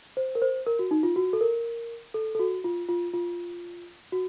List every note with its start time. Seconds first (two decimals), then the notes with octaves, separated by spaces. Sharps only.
0.17 C5
0.35 A#4
0.42 C5
0.67 A#4
0.79 F#4
0.91 D#4
1.03 F4
1.16 F#4
1.33 A4
1.41 A#4
2.14 A4
2.35 A4
2.39 F#4
2.64 F4
2.89 F4
3.14 F4
4.12 F#4